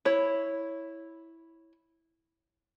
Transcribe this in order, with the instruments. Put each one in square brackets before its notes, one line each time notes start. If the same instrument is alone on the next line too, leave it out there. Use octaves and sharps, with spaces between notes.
[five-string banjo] E4 C#5